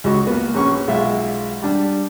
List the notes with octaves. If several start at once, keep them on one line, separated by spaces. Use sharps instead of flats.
C#2 F#4 C#6
A#3 B3
A#1 C#4 C#6
B1 G#3 F4 E5
G3 D4